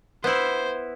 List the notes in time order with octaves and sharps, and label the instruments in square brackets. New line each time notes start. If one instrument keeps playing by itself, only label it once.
[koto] B3 E4 [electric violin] C5